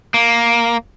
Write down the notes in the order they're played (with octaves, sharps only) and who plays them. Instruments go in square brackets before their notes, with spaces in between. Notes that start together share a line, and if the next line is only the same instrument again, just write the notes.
[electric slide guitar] A#3